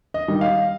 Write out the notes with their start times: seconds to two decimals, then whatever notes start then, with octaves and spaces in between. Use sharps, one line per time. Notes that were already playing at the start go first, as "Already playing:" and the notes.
0.14 D#5
0.28 D#3 G3
0.41 F5